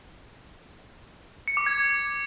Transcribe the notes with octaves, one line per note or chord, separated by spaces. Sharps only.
C#7
D6
G#6